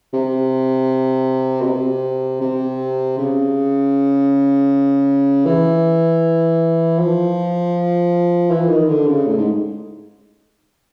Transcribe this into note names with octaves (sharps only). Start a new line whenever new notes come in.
C3
B2
C3
C3
C#3
E3
F3
E3
D#3
D3
C#3
A2
G#2